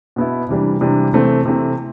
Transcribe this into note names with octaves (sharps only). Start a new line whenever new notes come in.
B2 B3 E4
C3 E3 G3 D4
C3 E3 G3 D4
C3 E3 A3 C4
C3 E3 A3 C4